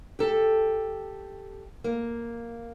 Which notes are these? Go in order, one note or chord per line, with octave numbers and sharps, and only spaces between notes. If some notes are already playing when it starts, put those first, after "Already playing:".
G4 A4
A#3